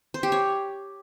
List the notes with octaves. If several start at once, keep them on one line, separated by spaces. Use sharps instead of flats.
C5
G4
C#5